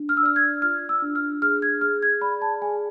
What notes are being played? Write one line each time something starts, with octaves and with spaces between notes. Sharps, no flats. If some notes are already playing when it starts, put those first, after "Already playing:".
Already playing: D4
F6
E6
D5 F6
G#6
F4 F6
E6
D4
F6
G#4 F6
G#6
G#4 F6
G#6
D5 B5
A5
G#4 G#5